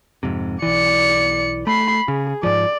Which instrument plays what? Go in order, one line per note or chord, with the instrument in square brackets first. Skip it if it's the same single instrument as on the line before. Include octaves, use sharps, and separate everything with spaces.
[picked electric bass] F2 G#2 C3
[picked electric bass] B1 E3 [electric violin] D5 C#7
[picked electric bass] A3 [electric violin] B5 C7
[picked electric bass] C#3 [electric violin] G#4
[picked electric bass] G#2 F3 [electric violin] D5